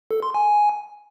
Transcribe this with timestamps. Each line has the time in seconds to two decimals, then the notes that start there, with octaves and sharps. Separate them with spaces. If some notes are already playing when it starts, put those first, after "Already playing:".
0.11 A4
0.23 C6
0.34 G#5